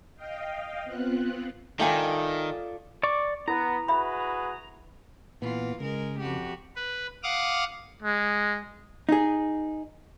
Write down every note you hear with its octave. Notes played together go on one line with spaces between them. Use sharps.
D#5 F5 G5
B3 C4 F4 F#6
D#3 F4 A4 D5 E5 G5 G#5
D5 C#6 D6
B3 E4 A#5
F#4 G#4 B4 E5 B5
A#2 E3 B3 F4
C#3 G#3 A#4
F2 F#4 G4
B4
F5 F#5 D6 D#6 F6
G#3
D#4 G#4